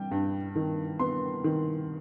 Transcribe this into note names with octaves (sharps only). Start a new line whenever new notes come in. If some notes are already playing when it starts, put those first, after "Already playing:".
Already playing: G3 G5
G2
D#3
B3 C6
D#3